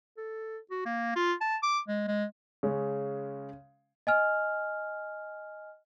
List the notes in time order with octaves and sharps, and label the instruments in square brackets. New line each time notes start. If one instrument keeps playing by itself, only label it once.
[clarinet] A4
F#4
A#3
F4
A5
D6
G#3
G#3
[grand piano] C#3 G#3 C#4
[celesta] D#5 G#5 F6